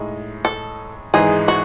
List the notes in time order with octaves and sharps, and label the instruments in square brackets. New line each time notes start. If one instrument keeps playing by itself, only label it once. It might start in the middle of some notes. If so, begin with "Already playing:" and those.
Already playing: [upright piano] A2 G#3 D#4
[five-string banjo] A4
[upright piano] G#1 G#2 E3 G#3 D#4 [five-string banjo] G#4
[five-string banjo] F#4